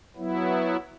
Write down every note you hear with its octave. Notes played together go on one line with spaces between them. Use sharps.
F#3 B3 E4